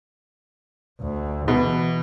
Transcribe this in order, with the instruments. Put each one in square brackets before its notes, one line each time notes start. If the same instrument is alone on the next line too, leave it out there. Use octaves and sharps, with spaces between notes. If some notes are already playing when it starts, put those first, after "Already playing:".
[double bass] D2
[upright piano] B2 [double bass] E3